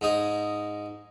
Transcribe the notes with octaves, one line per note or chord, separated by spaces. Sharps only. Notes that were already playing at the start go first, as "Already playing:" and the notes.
G#2 D#4 G#4